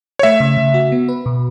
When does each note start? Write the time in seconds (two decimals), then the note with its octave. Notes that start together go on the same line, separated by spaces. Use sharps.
0.19 C#5
0.23 A3 E5
0.40 C#3
0.57 C#3
0.74 F#4
0.92 B3
1.08 B4
1.26 B2